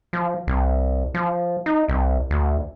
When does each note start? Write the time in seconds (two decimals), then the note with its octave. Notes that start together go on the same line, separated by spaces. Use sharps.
0.13 F3
0.47 C2
1.14 F3
1.66 D#4
1.88 C2
2.30 D2